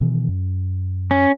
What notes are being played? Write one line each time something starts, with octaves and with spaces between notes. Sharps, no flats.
B2 D#3 E3
F#2
C#4